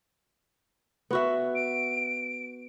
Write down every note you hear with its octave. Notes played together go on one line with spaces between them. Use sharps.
B3 F#4 E5
D7